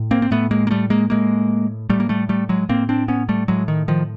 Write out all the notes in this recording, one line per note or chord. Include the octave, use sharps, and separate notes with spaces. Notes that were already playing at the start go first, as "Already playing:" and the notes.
Already playing: A2
A#3 C4
C4
A2 A3 B3
G#3 A#3
A#3
G3 A3
G#3 A#3
A2 G#3 A#3
A2 G3 A3
A#3
G3 A3
G3 A3
F#3 G#3
A2 A#3 C4
C4 D4
B3 C#4
G3 A3
A2 F#3 G#3
D#3
D#3 F3